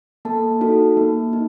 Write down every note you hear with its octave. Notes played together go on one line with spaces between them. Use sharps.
A#3 A4 A5
D#4 F#4 A4
A#3
D#4